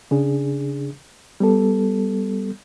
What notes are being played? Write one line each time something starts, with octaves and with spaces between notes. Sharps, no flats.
C#3 D4 G#4
G3 B3 A4